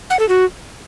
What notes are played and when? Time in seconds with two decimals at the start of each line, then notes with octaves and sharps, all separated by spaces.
0.10 F#5
0.19 A4
0.29 F#4